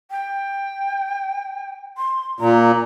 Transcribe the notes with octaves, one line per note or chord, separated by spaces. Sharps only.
G5
C6
A#2 A#5